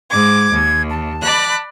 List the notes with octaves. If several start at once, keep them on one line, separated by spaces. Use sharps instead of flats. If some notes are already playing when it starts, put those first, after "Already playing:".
G#2 D6 G#6
D#2
A5
D5 B5 F#6